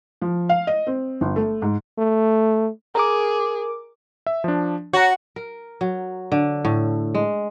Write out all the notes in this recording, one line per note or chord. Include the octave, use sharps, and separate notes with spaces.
F3
F5
D#5
C4
G1
A3
G#2
A3
G#4 A#4 D6
E5
F3 D4
F#4 C#5 A#5
A#4
F#3
D3
A2
G#3